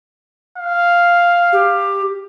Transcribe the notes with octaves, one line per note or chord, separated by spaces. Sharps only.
F5
G4